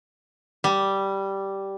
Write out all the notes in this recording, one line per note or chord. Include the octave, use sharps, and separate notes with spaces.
G3